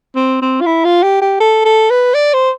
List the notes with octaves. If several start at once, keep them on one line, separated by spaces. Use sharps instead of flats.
C4
C4
F4
E4
F4
G4
G4
A4
A4
B4
D5
C5